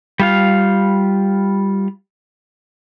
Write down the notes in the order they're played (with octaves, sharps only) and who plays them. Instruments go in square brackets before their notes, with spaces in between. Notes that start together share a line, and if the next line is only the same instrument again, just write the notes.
[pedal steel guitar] G3 F4 F5